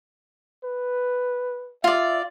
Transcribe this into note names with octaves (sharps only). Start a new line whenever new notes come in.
B4
F4 D5 E5